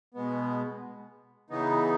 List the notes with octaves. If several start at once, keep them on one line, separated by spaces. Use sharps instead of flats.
B2 G#3 B3
C#3 E3 B3 D#4